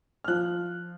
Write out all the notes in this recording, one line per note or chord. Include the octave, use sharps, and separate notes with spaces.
F6
F3 F#6